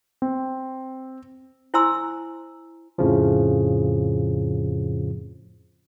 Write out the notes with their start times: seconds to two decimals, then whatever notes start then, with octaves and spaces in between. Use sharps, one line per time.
0.22 C4
1.74 E4 C5 G#5 A#5 C6 E6
2.98 F2 A2 C#3 F3